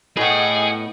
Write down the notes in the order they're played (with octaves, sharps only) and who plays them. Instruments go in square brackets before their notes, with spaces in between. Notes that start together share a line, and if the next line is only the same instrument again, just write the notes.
[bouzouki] A2 B3 [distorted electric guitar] G#4 [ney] D#5 [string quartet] F#5 G5